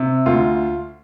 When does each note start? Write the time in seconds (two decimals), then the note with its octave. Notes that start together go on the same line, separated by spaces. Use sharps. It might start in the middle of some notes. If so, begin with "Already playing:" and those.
Already playing: C3
0.26 D2 F4